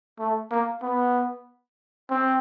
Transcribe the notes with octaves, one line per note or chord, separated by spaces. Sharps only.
A3
A#3
B3
C4